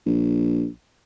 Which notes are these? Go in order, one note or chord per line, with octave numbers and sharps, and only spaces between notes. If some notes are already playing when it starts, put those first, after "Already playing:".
A#1